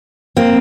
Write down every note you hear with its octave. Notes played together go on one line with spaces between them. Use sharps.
A#3 C4